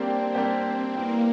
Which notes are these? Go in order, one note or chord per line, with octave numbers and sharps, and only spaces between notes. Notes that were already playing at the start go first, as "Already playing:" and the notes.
Already playing: G3 A#3 C4 D4 G4 C5
G3 A#3 D4 G4 C5
E3 G3 A#3 B3